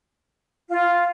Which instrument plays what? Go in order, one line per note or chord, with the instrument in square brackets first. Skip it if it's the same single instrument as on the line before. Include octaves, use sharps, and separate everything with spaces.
[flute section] F4